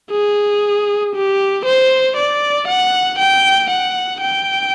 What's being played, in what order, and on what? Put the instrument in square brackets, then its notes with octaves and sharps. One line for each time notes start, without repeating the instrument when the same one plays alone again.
[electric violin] G#4
G4
C5
D5
F#5
G5
F#5
G5